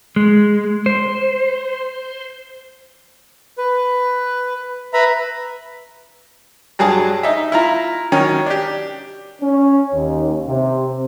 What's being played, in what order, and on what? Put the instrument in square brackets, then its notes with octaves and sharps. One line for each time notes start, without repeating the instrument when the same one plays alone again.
[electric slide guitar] G#3
C5
[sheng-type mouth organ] B4
B4 E5 A#5 B5
[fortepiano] G2 F#3 G#4 A5
D#4 E5
E4 F4 A#5
D#3 F#3 C#4
D4 G4
[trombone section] C#4
D#2
C3